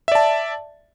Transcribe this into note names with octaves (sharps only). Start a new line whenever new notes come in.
D5 E5 A5